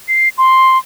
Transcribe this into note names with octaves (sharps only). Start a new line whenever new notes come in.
C7
C6